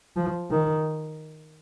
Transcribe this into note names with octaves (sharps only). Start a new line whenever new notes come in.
F3
D#3